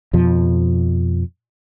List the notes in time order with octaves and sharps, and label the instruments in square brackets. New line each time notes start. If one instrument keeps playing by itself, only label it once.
[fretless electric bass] F2 B2 F3